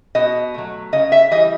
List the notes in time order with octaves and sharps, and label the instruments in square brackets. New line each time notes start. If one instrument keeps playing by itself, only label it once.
[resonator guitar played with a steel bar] B2 D#5
F#3 A3
C#3 D#5
E5
E3 G3 D#5